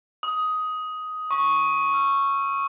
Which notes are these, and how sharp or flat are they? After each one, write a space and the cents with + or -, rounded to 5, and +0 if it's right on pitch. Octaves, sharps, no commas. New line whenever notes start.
D#6 +10
C#6 -5
E6 +40